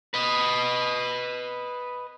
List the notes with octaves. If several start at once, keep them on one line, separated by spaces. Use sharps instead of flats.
B4 D#5